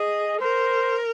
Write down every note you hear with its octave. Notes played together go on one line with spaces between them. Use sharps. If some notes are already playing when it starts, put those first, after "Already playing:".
Already playing: G#4 D#5
A#4 C5